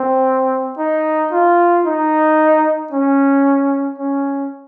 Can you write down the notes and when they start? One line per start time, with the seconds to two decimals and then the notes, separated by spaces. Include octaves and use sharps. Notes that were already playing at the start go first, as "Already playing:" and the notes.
Already playing: C4
0.78 D#4
1.32 F4
1.85 D#4
2.92 C#4
3.98 C#4